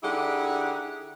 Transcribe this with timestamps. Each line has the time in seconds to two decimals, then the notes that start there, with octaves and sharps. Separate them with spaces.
0.03 D3 D#4 E4 G4 G#4 F#5